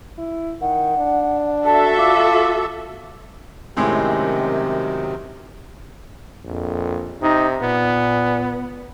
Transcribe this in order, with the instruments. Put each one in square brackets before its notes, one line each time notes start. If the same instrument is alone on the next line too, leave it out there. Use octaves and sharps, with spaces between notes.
[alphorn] E4
[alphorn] D#3 [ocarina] F#5
[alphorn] D4
[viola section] F#4 A4 E5 [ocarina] A5
[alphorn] F4 [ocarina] D6
[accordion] F#2 C3 D#3 [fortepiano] A2 G#3 C4
[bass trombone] A#1 [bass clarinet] F2
[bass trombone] C3 [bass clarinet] D#4
[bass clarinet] A#2 [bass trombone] B3